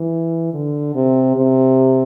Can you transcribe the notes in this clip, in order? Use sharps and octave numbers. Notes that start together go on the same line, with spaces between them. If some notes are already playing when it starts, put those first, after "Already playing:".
Already playing: E3
D3
C3
C3